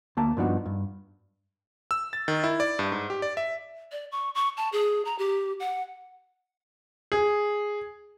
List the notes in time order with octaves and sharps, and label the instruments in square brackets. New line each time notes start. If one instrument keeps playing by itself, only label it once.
[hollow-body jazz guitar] D2 A#3 A5
G2 F3 B3 D4 D#4 F#4
G2
[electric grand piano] E6
A6
D#3
E4
D5
G2
G#2
G4
D5
E5
[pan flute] D5
C#6
C#6
A5
G#4
A#5
G4
F#5
[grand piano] G#4